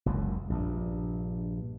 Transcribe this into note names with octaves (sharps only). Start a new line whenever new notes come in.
F#1 C#2 F#2
A#1 G2